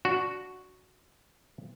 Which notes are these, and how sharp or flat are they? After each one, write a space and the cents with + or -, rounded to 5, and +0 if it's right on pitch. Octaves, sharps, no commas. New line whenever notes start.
D4 -10 F#4 +0